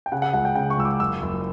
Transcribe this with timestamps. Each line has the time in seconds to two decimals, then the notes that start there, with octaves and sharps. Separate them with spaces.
0.06 G5
0.12 C#3 F#5
0.22 F#5
0.33 C#2 F#5
0.45 G5
0.55 C#3 G5
0.70 C#6
0.78 C#2 E6
0.85 D6
1.00 F#1 E6
1.22 F#1